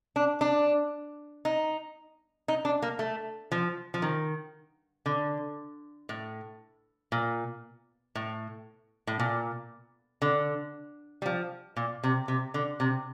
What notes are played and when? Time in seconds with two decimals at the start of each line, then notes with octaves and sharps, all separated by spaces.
0.16 D4
0.41 D4
1.45 D#4
2.48 D#4
2.65 D4
2.82 A#3
2.99 A3
3.52 F3
3.94 F3
4.02 D#3
5.06 D3
6.09 A2
7.12 A#2
8.15 A2
9.07 A2
9.20 A#2
10.22 D3
11.22 G3
11.26 F3
11.76 A#2
12.04 C3
12.28 C3
12.54 D3
12.80 C3